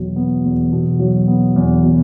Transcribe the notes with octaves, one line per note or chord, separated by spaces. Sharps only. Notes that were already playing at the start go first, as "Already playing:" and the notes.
Already playing: E2 B2 F#3
B3
E2
B2
F#3
B3
E2
B2